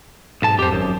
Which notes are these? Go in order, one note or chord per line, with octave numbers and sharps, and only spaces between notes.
B1 G#2 A5
F2 G4 C5
G#1 F#2